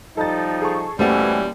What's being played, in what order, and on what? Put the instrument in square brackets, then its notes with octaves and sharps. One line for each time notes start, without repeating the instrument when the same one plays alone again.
[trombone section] F3 G3 D#4 [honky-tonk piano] A4 A6
[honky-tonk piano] G#4 A4 C#6
[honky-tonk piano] D#2 [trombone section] B2 E3 C#4 [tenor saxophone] G3 [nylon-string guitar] A3 C5 F#5